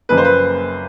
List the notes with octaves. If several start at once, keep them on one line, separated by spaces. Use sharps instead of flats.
F#1 F#2 C#3 F3 A#3 B4
C5
B4